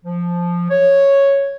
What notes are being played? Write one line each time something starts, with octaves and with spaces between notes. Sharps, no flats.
F3
C#5